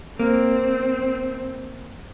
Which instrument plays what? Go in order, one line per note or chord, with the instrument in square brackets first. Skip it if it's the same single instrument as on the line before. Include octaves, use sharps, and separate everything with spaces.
[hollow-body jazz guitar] A#3 [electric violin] C4